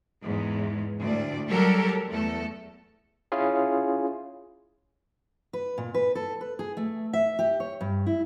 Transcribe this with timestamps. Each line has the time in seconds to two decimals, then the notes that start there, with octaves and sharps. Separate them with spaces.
0.23 E2 G#2 E3
0.99 D2 A2 D5
1.48 F#3 G3 G4 A4 A#4
2.09 E2 A3 A4
3.32 C#4 E4 F4 G#4
5.53 B4
5.78 A#2
5.94 B4
6.15 A4
6.41 B4
6.59 G#4
6.77 A3
7.13 E5
7.39 G4
7.60 C#5
7.81 G2
8.07 E4